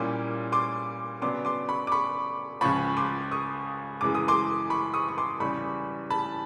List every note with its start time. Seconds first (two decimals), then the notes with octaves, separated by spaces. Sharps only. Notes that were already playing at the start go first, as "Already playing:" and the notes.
Already playing: A#2 G3 A#3 C#4 E4 C6 D6
0.52 C6 D6
1.22 C#3 F#3 B3 D4 C6 D6
1.45 C6 D6
1.69 B5 C#6
1.87 D6
1.92 B5 C#6
2.61 C#2 C#3 F3 B5 C#6
2.97 C6 D6
3.31 C#6 D#6
4.01 F#2 C#3 E3 G#3 D6
4.15 D#6
4.28 C6 D6
4.70 B5 C#6
4.94 C#6 D#6
5.08 C#6
5.18 C6 D6
5.40 E2 C#3 E3 G3 B5 C#6
6.10 A5 B5